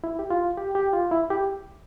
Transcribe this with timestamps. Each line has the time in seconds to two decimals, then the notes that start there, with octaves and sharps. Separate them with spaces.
0.04 E4
0.19 G4
0.30 F4
0.57 G4
0.75 G4
0.93 F4
1.11 E4
1.30 G4